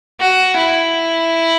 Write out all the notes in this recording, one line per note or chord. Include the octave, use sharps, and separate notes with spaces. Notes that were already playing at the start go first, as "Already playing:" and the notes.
F#4
E4